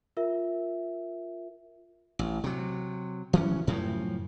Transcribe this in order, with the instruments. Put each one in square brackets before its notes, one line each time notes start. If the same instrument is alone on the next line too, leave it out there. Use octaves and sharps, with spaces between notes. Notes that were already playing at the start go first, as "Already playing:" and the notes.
[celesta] F4 A#4 E5
[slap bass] A1
C3 F#3
E3 F#3 A3 C#4
F#2 A2 C#3 F3